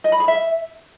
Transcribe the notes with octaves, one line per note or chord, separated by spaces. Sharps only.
D#5
B5
G#4
E5